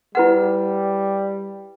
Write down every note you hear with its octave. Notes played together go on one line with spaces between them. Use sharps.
G3 E4 B4 F#5